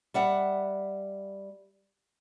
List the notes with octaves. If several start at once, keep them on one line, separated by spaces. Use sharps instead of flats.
G3 E5 F#5